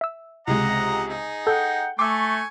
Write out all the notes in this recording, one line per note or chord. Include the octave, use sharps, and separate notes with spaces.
E5 E6
C#2 C3 G#3 D#5 F#5 A#5
D#4 G#4
A4 F#5 G5 G6
A3 G#5 C#6 D6 E6